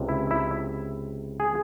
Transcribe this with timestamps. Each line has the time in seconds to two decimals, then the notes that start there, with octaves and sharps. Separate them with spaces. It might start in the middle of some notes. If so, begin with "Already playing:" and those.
Already playing: C#2 C3
0.09 E4
0.31 E4
1.40 G#4